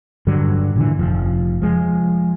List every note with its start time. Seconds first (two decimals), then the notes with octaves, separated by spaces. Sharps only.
0.27 G2 D3 F#3
0.76 A#2 D3 E3
0.99 F1 F3
1.62 F3 G#3